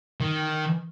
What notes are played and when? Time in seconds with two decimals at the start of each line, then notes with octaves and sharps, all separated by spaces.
0.21 D#3